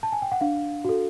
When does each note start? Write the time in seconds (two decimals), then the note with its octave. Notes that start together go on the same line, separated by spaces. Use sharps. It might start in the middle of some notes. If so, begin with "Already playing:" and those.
0.03 A5
0.12 G#5
0.22 G5
0.32 F#5
0.41 D4 F5
0.85 F#4 A4